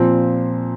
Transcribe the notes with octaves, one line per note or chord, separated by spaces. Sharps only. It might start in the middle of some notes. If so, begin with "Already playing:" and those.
Already playing: A#2 F3 C4